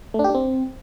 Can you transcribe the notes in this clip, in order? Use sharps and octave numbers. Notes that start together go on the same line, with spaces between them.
A3
D4
G4
D4
C4